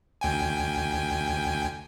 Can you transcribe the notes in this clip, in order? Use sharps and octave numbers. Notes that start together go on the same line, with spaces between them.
D2 G5 G#5